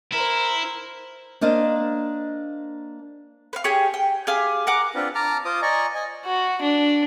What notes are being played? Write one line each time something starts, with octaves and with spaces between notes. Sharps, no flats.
E4 A#4 C5
A#3 D4 C5 D#5 F5
B4 F5
G4 G#4 C#5
G5
G4 G#4 F5 G#5
A#4 F#5 D6
C4 D4 F4 B4
A5 A#5 D6 F6
F4 C5 D6 D#6
D5 D#5 G#5 A#5 C#6
D#5 G#5
F#4
D4